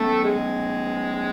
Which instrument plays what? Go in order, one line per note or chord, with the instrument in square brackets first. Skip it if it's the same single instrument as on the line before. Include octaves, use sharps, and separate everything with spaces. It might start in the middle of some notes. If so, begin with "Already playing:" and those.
Already playing: [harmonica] A3 A4 [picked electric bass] B3 C#4
[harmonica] G#3 G#4